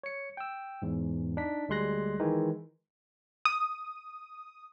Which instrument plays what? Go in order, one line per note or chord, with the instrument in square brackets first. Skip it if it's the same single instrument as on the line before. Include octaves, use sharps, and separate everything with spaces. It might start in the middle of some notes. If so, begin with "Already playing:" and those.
[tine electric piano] C#5 C#7
G5 E6
E2 G#2
D4 D#4 B6
D2 G3 G#3 C6 F#6 A#6
D#3 E3 G#3 D#4
[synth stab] D#6